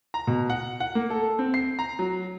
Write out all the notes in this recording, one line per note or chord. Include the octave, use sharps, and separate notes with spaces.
A#5
B2
F#5
F#5
A#3
A4
C4
C7
A#5
F#3